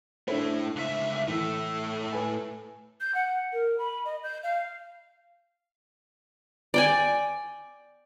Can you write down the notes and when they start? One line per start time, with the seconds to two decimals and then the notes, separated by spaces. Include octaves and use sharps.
0.28 A3 D4 E4 A4 C5
0.76 C#2 E5
1.28 A2 E3 A4
2.12 B4 G#5
3.01 G6
3.15 F#5
3.53 A#4
3.79 B5
4.05 D#5
4.24 G6
4.43 F5
6.74 D5 G5 G#5